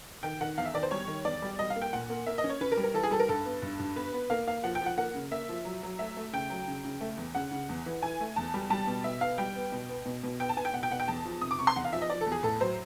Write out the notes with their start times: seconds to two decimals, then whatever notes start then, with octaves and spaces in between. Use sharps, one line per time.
0.23 D#3 G5
0.41 D#3 F#5
0.58 E2 F5
0.65 E5
0.74 D#3 D5
0.83 C5
0.91 G3 C#5
1.07 D#3
1.25 E2 D5
1.42 G3
1.59 G3 D#5
1.70 F5
1.76 A#3
1.82 G5
1.93 A#2 F#5
2.09 A#3
2.26 A#3 E5
2.38 D#5
2.44 C#4
2.50 C#5
2.61 C#4 B4
2.72 A#4
2.77 G3
2.83 A#4
2.94 E3 A4
3.03 G#4
3.11 G3 A4
3.20 A#4
3.29 G2 A4
3.45 B3
3.62 G2
3.79 G2
3.96 B3 B4
4.13 B3
4.30 A#3 F5
4.47 A#3 F5
4.64 F3 F#5
4.75 G5
4.81 F3 F#5
4.97 A#3 F#5
5.15 C#3
5.31 A#3 E5
5.49 F3
5.65 F#3
5.83 F#3
5.99 A3 E5
6.17 A3
6.33 C#3 G5
6.50 F#3
6.68 C#3
6.85 C#3
7.01 A3
7.17 E2
7.35 C#3 F#5
7.52 C#3
7.69 E2
7.86 E3
8.02 E3 G#5
8.20 A3
8.36 E2 A5
8.54 G3
8.70 G3 A5
8.87 B2
9.04 B2 E5
9.21 B3 F5
9.38 G3 G5
9.56 B3
9.72 B2
9.89 B3
10.06 B2
10.23 B2
10.40 B3 G5
10.49 A5
10.57 B3 G#5
10.65 G5
10.73 B2 F#5
10.83 G5
10.90 B2 F#5
11.00 G5
11.08 E2 A5
11.25 F3
11.41 C3 D#6
11.51 D6
11.59 C3 C#6
11.67 C6
11.76 E2 F#5
11.85 F5
11.93 F3 E5
12.02 D#5
12.10 F3 D5
12.21 A4
12.26 E2
12.32 G#4
12.43 A2 A4
12.60 F#3 C5